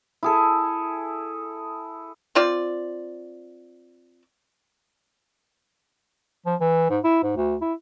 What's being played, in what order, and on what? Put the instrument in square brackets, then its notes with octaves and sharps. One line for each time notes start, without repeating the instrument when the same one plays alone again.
[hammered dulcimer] E4 G#4 A4
[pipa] C4 F4 D5
[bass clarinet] F3
E3
G#2
E4
G#2
D2
E4